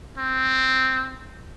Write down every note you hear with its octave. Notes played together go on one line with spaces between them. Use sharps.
C4